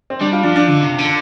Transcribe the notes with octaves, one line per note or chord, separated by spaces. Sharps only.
C4
G3 D4
F4
F3 D4
D4
D3
C3
D3